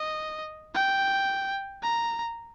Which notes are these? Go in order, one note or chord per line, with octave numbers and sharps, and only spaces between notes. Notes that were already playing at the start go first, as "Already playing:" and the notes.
Already playing: D#5
G5
A#5